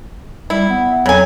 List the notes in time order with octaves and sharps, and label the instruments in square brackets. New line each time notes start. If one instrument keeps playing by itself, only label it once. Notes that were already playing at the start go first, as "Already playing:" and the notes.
[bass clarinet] G3 [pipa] E4
[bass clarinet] B3
[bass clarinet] F2 [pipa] C#3 G#5 [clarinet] F#3